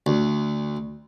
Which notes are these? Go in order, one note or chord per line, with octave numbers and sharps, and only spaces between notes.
D2